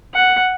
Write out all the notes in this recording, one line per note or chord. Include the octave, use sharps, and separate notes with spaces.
F#5